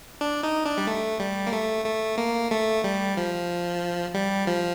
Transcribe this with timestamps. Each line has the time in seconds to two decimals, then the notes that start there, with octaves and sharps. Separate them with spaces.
0.21 D4
0.43 D#4
0.66 D4
0.78 G3
0.87 A3
1.20 G3
1.47 A#3
1.53 A3
1.86 A3
2.18 A#3
2.51 A3
2.84 G3
3.17 F3
4.14 G3
4.47 F3